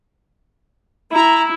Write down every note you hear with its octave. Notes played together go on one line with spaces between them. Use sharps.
E4 A#5